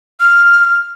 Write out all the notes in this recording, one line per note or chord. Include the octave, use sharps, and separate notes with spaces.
F6